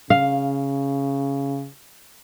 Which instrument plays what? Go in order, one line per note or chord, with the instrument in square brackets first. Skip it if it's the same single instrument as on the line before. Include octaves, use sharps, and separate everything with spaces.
[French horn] C#3 [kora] F5